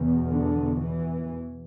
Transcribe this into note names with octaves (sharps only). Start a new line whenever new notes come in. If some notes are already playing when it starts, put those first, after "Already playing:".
Already playing: E2 B2
D3
E3